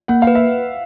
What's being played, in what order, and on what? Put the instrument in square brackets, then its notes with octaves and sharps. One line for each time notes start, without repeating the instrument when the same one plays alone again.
[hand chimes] A#3 [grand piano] F#5
[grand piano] F5
[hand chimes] B4
[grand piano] E5